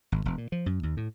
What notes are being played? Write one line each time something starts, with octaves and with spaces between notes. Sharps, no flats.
G#1
E1
A#2
F3
F#2
D#2
A2